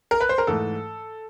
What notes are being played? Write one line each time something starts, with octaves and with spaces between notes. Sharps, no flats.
A#4
B4
C5
A#4
G#2 E3 A3 A4